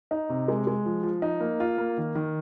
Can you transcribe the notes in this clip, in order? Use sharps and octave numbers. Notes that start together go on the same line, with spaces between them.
D#4
C3
G#3
G#3
F3
F3
D#4
A#3
F4
A#3
D#3
D#3